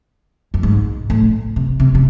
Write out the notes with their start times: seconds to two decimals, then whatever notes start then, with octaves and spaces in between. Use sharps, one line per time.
0.54 F#2
0.63 G#2
1.10 A2
1.56 C3
1.80 C3
1.95 C3